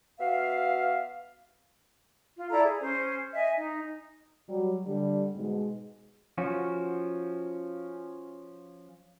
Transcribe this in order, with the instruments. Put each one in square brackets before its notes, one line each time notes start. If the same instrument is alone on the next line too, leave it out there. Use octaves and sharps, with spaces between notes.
[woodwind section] B3 F#4 E5 F5
[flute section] F4
E4 A4 D5 A#5
G#4
C#4 C5
D#5 E5 G#5
D#4
[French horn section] F#3 G3
D3 G3
G#2 B2 G#3
[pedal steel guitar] F3 C#4 F#4